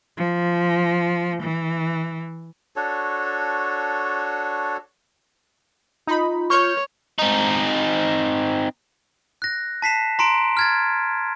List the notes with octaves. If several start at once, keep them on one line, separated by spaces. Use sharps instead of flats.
F3
E3
D4 F#4 A4 C#5
D#4 F4 B5
C#5 C#6 F6 G6
C4 D#4
F#6 A#6
A5 B6 C7 E7
A#5 C6 D7
F6 G#6 A6